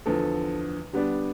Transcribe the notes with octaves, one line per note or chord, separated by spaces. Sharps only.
E2 D3 F3 A4
D3 G3 B3 D4